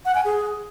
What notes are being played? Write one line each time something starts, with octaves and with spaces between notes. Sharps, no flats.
F#5
G#5
G#4